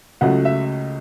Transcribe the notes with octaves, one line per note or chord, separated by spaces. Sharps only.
C#2 C#3 F#3 A3 F#5
E5